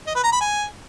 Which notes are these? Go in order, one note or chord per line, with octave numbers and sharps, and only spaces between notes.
D#5
B4
A#5
B5
G#5